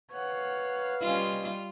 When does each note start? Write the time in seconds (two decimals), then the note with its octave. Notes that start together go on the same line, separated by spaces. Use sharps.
0.12 B4 C#5 F5 F#5
1.02 G3 C#4 F4 D#5